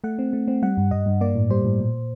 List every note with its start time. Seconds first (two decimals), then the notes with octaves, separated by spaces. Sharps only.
0.04 A3 F#5
0.19 C4
0.33 A3
0.48 C4
0.62 G3 F#5
0.77 G2
0.91 G2 D#5
1.06 G2
1.21 A#3 D5
1.35 A2
1.50 G3 C5
1.65 A2
1.80 A#2